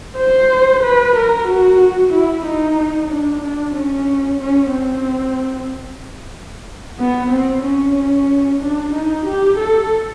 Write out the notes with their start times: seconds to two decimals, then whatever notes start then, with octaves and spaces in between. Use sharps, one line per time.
0.18 C5
0.84 B4
1.16 A#4
1.48 F#4
1.81 F#4
2.13 E4
2.45 D#4
3.10 D4
3.43 D4
3.75 C#4
4.40 C#4
4.72 C4
6.99 B3
7.31 C4
7.64 C#4
8.61 D4
8.94 D#4
9.26 G4
9.58 A4